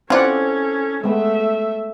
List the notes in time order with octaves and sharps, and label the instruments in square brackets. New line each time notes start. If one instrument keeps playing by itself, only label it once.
[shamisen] E3 F4 [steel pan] C4 D5 F#5 [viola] C#4 A4
[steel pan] G#3 B3 [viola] A3 E5